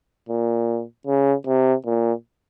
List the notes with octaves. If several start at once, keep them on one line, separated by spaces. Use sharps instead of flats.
A#2
C#3
C3
A#2